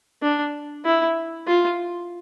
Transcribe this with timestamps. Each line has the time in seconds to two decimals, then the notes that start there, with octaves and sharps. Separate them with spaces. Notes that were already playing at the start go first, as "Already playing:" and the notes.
0.22 D4
0.85 E4
1.47 F4